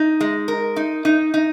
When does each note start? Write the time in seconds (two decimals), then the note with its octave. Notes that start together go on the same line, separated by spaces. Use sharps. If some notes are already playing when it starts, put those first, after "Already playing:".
Already playing: D#4
0.20 G#3
0.48 A#4
0.76 D#4
1.05 D#4
1.34 D#4